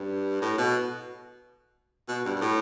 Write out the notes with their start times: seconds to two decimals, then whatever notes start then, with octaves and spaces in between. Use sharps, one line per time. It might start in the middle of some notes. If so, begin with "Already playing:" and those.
Already playing: G2
0.42 A2
0.58 B2
2.08 B2
2.25 G2
2.36 G2
2.41 A2